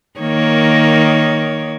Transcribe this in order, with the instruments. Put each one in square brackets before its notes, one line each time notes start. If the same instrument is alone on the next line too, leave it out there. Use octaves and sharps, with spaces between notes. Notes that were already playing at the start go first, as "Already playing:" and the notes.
[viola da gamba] D#3 A#3 C#5